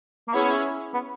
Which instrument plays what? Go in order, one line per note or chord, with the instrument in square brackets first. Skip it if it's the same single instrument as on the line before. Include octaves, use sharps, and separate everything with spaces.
[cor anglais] A#3
[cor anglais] B3 [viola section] C#4 E4 G#4 C#5
[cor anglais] B3